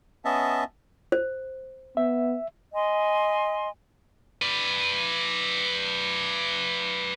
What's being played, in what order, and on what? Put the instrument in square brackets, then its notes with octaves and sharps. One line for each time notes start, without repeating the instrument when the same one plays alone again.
[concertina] B3 C#4 D#5 E5 A5
[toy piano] C5
[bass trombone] B3 [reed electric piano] E5
[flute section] D#5 G#5 C6
[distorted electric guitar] B4 D5